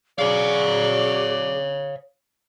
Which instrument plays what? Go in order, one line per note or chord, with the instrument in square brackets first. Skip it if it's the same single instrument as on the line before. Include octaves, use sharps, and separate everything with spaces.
[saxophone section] F#3 D5 [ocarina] G#4 [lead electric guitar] C#5 F5